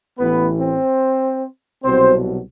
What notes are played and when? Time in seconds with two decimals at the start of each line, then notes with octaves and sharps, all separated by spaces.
0.19 A1 A2 E3 B3 B4
0.60 C4 C5
1.84 C2 B2 F#3 C4 C5